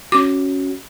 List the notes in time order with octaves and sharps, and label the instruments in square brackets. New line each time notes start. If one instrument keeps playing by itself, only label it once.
[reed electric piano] C#4 F#4 [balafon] D6